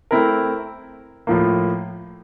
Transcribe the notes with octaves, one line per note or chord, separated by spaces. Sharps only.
A3 C4 E4 A#4
A2 F3 A#3